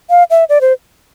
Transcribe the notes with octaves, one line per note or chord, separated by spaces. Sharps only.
F5
E5
D5
C5